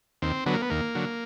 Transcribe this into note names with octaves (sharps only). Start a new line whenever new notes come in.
D#2 C4
D3 F#3 B3
A#3
B3
D#2 A#3
D3 F#3